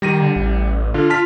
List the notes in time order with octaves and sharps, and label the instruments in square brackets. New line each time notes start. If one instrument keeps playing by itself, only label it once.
[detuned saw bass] D#3 [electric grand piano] G3 A#6 D#7
[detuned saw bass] D3
A1
[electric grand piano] D3 [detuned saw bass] F4
[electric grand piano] A5 F6 B6